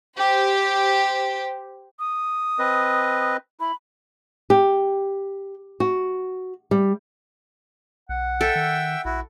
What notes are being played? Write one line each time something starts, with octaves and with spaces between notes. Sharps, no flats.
G4 C5
D#6
C4 B4 D#5
E4 B5
G4
F#4
G3
B1 F#5
A4 E5 G5 E6
D#3
A#1 E4 F#4